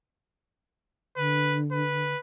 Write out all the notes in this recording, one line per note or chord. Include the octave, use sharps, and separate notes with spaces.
D3 B4
B4